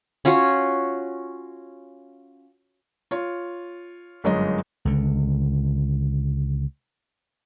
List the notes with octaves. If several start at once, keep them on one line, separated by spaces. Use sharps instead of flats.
C#4 F4 F#4 C#5
F4 C#5
G1 F#2 G#3 D#5
C#2 D3